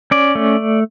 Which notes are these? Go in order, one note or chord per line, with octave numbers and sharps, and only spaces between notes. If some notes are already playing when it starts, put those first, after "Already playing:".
C#4 D5
A3